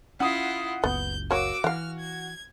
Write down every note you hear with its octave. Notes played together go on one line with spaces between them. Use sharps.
C#4 E4 F4 F#5 D#6
F#1 C#2 B3 G6
A#3 F#4 C#5 D6 E6
E3 F5 F#5 F6
G#6